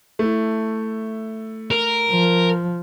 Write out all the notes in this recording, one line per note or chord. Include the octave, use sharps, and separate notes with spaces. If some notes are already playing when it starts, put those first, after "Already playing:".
A3 E4
A#4
F3